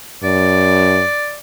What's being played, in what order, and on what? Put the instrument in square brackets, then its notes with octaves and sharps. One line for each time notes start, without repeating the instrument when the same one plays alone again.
[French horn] F#2 [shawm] D5